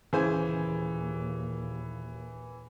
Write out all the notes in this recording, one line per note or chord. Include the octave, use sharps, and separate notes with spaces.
D#2 A#2 C#3 E3 G#4 C5 G#5